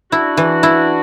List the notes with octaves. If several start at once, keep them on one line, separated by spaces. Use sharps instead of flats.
D4 E4 F#4
E3
E4